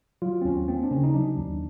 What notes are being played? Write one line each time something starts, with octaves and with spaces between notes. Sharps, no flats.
F#3 F4
C4
D#2 C#4
A#3 C4
D4
C#3 C#4
D#4
F#3 D4
D#2